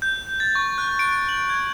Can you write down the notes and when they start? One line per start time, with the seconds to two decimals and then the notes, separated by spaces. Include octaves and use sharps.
0.02 G6
0.40 A6
0.55 C#6
0.78 F#6
0.99 D7
1.29 F#7
1.50 G#6